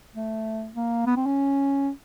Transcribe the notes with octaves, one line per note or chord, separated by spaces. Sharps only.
A3
A#3
B3
C4
C#4